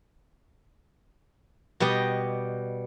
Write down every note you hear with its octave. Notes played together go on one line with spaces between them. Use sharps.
B2 G3 G4 D#5